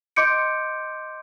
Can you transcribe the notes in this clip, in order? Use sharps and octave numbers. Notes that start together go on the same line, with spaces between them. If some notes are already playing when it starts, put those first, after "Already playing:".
D#5 C6 D6 G6 C#7 D7